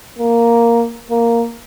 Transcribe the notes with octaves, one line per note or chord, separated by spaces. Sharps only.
A#3
A#3